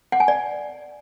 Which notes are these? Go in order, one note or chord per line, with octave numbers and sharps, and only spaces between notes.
F#5
G#5
D5